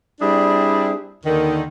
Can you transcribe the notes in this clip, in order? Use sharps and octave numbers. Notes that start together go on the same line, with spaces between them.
G3 C4 D4 E4 G#4
D#2 D3 D#3